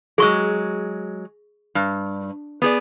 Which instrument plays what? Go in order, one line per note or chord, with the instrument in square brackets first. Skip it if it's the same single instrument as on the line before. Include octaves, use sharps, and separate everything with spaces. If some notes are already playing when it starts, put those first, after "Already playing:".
[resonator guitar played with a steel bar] F#3 G#3 [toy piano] G#4 C#6 E6
[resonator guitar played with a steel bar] G2
B3 G#4 D5